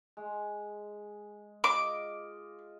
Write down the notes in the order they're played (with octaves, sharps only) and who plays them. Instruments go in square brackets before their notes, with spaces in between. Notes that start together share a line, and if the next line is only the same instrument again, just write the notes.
[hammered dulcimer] G#3
[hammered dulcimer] F4 D#5 [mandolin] D6